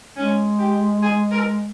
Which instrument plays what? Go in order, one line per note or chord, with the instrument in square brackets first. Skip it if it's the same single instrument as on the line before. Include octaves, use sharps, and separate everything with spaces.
[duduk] G#3 [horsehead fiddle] C#4
[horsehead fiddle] G4
G#4
A#4